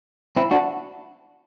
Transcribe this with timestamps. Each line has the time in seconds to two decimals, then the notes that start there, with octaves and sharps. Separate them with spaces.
0.36 C4 E4
0.51 D4 F#4